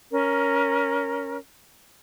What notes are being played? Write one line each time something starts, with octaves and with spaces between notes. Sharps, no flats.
C#4 A#4